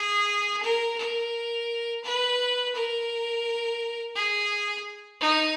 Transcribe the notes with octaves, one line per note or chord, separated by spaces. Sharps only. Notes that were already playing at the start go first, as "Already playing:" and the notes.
Already playing: G#4
A#4
A#4
B4
A#4
G#4
D#4